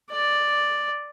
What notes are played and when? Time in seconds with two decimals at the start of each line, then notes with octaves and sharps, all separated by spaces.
0.11 D5